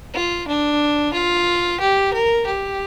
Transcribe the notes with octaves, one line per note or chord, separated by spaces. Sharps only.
F4
D4
F4
G4
A#4
G4